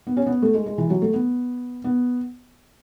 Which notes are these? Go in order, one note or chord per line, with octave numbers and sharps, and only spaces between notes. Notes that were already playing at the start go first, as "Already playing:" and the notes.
B3
C#4
B3
A3
G#3
G#3
E3
F#3
A3
B3
B3